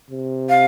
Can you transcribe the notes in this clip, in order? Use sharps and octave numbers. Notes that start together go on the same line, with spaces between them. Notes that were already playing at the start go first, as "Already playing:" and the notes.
C3
F5